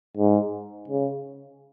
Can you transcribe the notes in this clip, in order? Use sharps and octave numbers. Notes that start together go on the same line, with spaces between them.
G#2
C#3